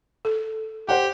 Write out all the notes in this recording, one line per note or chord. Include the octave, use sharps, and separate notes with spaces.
A4
G4 C5 F#5